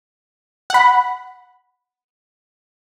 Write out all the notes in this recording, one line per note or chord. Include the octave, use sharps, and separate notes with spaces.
F#5 B5